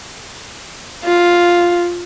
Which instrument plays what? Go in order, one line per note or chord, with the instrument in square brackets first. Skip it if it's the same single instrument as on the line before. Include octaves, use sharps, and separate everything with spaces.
[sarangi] F4